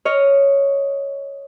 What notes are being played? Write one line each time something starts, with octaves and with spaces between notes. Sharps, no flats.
C#5 D#5 F6